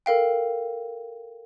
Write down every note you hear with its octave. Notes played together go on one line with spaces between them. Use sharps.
A4 A#4 F5 G5